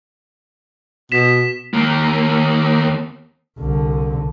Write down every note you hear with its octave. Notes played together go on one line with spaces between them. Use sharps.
B2 B6 E7
D#2 A#3
C2 D3